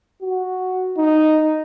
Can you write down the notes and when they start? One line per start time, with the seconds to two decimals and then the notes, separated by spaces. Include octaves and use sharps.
0.22 F#4
0.97 D#4